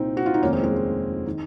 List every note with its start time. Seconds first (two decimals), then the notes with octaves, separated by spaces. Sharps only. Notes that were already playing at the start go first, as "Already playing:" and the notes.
Already playing: C2 A#2 C4 D#4
0.17 F#4
0.26 F4
0.34 D#4
0.43 F1 D#2 D#3 A#3 C#4
0.53 G#3 C4
0.64 G#3
1.26 D#3